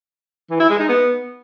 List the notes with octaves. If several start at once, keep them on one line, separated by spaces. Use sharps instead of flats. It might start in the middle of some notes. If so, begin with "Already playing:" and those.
E3
E4
G#3
D#4
B3